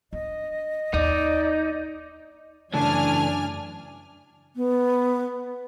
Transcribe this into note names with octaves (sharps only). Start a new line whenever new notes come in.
D4 D#5
D#2 D#4 D5
F#2 C#3 E3 A3 D4 G#5 A5 F6
B3